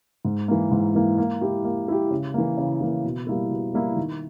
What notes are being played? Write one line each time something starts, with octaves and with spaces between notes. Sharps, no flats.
G#2
E3 A#3
G#2
E3 A#3
A#3
E4 G4
A#3
E4 G4
C#3
E3 A#3
C#3
E3 A#3
B2
G3 A#3 E4
B2
G3 A#3 E4
D#3